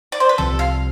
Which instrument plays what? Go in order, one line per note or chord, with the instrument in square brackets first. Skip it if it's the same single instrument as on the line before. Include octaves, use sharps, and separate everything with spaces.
[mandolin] D5
C5
B4
[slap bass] C2 C3 F3 C4 [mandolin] A4
[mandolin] F5